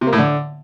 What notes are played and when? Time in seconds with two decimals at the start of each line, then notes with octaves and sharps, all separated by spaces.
0.01 C3
0.07 A#3
0.13 A2
0.18 D3